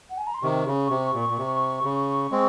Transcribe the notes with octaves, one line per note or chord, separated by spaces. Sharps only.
F#5
G#5
A#5
C6
C3 D#3 C#6
C#3
C3
A#2
A#2
C3
C#3
G#3 C4